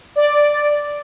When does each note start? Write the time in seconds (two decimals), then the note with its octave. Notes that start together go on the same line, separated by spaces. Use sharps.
0.16 D5